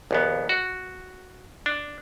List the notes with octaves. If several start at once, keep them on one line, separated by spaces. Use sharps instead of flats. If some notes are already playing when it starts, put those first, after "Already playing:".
A#1 D#2 B3
F#4
D4